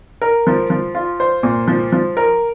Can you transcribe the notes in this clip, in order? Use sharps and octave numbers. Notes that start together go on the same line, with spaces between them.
A#4
F3
F3
F4
C5
A#2
F3
F3
A#4